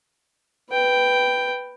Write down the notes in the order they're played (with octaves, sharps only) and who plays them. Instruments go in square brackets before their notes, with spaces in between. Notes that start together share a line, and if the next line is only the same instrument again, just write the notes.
[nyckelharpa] B4 G5